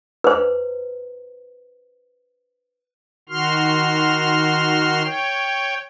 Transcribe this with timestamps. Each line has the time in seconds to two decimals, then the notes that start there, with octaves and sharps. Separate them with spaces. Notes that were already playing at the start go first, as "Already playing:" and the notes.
0.24 B4 C5
3.29 D#3 F#4 C6 F6
5.05 C#5 G5